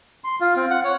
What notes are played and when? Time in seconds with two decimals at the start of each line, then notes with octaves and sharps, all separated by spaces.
0.24 C6
0.40 F4
0.56 C4
0.70 F#5
0.84 C#5